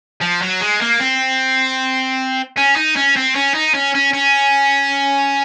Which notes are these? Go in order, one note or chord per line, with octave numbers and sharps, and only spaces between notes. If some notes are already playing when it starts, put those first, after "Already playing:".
F3
F#3
G#3
A#3
C4
C#4
D#4
C#4
C4
C#4
D#4
C#4
C#4
C#4